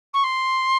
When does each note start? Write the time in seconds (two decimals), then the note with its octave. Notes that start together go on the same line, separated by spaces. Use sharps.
0.13 C#6
0.23 C6